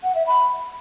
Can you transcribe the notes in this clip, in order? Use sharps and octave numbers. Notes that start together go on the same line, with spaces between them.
F#5
E5
B5